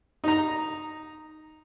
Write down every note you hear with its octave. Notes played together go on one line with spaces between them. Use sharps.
D#4 A#5